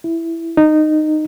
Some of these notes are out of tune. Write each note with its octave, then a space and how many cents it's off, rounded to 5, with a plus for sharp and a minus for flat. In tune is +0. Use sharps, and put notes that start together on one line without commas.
E4 +5
D#4 -15